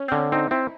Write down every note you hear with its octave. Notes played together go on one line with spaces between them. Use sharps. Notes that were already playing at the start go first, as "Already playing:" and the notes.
Already playing: C#4
C4
D3 C#4
C4 D#4
C4 E4